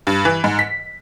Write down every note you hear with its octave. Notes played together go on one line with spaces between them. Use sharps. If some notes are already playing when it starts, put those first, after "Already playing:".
G2
E3
G#2
B6